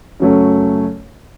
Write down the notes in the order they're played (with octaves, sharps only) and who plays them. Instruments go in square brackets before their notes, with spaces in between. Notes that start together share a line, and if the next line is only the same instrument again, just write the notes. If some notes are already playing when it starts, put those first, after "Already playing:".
[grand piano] F#2 C#3 F#3 A3 C#4